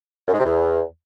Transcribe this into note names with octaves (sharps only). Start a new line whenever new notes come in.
F#2
G#2
C3
E2